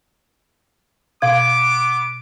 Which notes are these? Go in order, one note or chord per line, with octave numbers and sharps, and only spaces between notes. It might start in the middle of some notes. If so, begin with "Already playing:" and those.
B2 B3 F5 D6 G#6